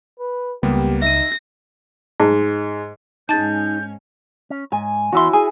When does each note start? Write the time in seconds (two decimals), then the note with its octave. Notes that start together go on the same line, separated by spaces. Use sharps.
0.20 B4
0.63 C#2 G3 A#3 B3 G4
1.02 D#4 E5 A#6 D#7
2.20 G#2
3.29 G#2 C#4 D#4 G#4 A5 G6 A6
4.50 C#4
4.72 G#2 G#5
5.12 E2 E4 F#4 C6
5.33 G#4 G#5